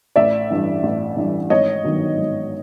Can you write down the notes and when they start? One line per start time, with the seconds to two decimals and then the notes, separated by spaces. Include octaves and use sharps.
0.16 A1 D5 E5
0.50 G2 E3
0.83 A1
1.17 G2 E3
1.50 G#1 C#5 D#5
1.84 G2 D#3 F#3 B3
2.18 G#1